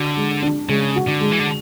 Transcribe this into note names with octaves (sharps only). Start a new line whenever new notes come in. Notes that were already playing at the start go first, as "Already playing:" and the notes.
Already playing: D3 F#4
G#3
D4
C#3 G#3
F#4
D3
G#3
E3
D3